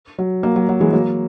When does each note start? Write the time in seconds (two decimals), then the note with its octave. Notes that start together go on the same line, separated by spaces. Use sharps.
0.18 F#3
0.43 F#3 A#3
0.56 F#3
0.69 F#3
0.80 E3 G#3
0.93 F#3 A#3